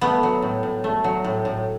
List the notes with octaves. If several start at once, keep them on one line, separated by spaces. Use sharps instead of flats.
A3 B3
F#3
A2
A2
A3
F#3
A2
A2